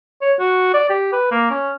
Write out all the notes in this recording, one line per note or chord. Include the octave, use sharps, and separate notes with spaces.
C#5
F#4
D5
G4
B4
A#3
C#4